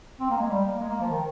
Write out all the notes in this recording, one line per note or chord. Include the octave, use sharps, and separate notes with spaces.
C4
A#3
G#3
G3
A#3
G#3
A#3
F3
D#3